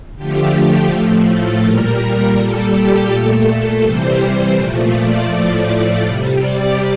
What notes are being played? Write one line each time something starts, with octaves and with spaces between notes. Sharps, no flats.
D3 F3 A3 G4
A2 F3 A3
A4
A#2 G3 A#4
A#2 G3 A4
G4
A#2 A3 A4
C3 E3 G3 C5
C5
A#2 F3 A3
D5
A2 F3 A3 D5
C3 G3
D5